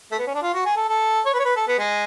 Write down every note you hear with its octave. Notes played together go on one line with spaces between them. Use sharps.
A3
B3
C#4
D4
F4
F#4
G#4
A4
A4
C#5
B4
C#5
B4
A4
B3
G#3